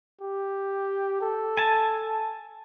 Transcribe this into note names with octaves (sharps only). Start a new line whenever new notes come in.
G4
A4
G#5 A5